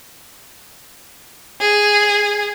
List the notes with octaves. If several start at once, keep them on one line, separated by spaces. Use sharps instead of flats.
G#4